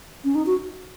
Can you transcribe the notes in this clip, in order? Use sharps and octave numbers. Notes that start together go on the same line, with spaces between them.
C#4
D#4
F#4